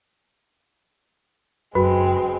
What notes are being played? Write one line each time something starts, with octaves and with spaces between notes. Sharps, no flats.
F#1 F#2 G#3 C4 F#4 B4